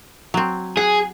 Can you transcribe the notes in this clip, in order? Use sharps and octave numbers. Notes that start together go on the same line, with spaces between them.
F#3 C4
G#4 F#5